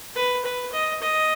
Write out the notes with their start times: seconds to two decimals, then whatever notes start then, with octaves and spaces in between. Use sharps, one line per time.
0.15 B4
0.44 B4
0.72 D#5
1.02 D#5